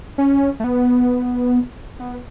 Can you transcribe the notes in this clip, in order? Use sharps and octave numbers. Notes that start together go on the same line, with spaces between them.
C#4
A3
B3
B3